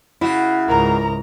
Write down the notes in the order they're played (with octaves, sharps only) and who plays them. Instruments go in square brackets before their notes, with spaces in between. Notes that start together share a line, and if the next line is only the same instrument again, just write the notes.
[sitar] C#3 F#4 [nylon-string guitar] E4
[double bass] C#2 G#2 [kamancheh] A#4 A#5